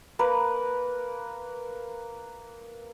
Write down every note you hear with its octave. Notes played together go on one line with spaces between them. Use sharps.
A#3 A#4 B4